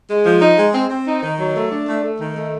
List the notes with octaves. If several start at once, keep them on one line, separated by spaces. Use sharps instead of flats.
G#3
F3
D#4
G#3
C4
C4
D#4
D#3
F#3
A3
D4
A3
A3
D#3
A3